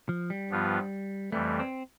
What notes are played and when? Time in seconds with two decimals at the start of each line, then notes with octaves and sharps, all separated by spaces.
0.09 F3
0.30 G3
0.50 G2 F3 B3 F4
1.32 F2 E3 G3 A3
1.60 C4